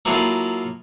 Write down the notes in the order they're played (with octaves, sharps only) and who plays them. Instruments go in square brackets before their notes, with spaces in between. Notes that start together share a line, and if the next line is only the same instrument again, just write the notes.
[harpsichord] F#3 A#3 E4 F4 G#4 A4